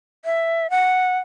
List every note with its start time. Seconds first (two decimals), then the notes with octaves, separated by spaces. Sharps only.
0.25 E5
0.70 F#5